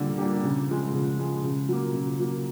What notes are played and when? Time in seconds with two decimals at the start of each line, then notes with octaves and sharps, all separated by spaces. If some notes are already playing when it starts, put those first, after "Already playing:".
Already playing: D3 G3 A#3 D4
0.18 G3 A#3 D4 G4
0.43 C#3
0.68 F3 G#3
0.93 C#3
1.18 F3 G#3
1.43 C#3
1.69 F#3 A#3
1.94 C#3
2.19 F#3 A#3